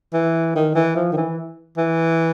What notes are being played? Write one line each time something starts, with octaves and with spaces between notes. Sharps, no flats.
E3
D#3
E3
F3
D#3
E3
E3